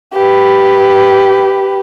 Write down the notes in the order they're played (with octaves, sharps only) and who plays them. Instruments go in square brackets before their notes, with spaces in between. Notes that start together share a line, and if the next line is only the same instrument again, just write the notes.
[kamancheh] G4 B4